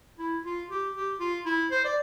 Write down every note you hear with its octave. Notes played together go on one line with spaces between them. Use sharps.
E4
F4
G4
G4
F4
E4
C5
D5